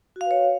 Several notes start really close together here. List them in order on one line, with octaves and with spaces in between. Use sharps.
F#4 F5 B4 C#5